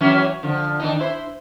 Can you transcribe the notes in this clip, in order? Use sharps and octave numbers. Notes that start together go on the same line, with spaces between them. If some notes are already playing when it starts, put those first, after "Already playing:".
E3 F#3 C#4
D3 F3
D#3 D4 D#4
E4 C5